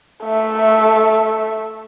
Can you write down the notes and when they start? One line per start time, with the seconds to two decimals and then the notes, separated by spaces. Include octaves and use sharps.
0.23 A3 E5